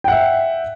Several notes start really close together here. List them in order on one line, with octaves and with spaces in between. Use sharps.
G5 F#5 E5